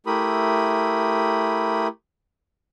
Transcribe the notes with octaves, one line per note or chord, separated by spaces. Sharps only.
A3 E4 G4 A#4 B5 D#6